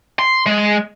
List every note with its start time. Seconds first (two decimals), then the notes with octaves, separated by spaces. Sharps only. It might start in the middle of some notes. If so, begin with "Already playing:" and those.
0.19 C6
0.46 G#3